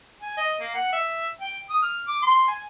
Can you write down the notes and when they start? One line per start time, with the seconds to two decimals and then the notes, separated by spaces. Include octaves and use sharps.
0.21 G#5
0.37 D#5
0.60 A#3
0.74 F#5
0.92 E5
1.40 G5
1.70 D#6
1.82 F6
2.08 D6
2.22 C6
2.48 G#5